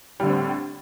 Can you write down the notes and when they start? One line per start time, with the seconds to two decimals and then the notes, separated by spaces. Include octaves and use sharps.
0.20 G3
0.23 D3
0.26 A2
0.30 C4